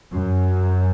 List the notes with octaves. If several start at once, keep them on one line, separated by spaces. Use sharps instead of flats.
F#2